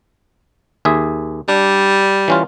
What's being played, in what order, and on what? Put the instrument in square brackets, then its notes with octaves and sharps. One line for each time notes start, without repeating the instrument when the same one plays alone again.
[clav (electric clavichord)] D#2 G#4 E5
[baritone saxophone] G3 [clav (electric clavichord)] D4
[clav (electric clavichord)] E3 C#4 F4